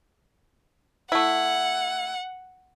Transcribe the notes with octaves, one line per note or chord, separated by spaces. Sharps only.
A3 E4 F#5